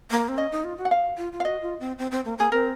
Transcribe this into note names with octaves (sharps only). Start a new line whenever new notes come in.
A#3
C4
C#4 D#5
D#4
F4
F#4
F#5
F5
F4
F4
F5
F#4 D#5
F4
C4
C4
C4
A#3
A#3 G#4
C4 A#4